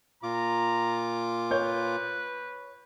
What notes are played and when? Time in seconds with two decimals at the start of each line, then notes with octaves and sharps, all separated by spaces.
0.23 A#2 F4 A#5 D6
1.51 B4 C#5 G6